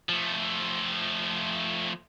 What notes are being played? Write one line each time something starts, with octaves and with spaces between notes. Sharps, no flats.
F3 A3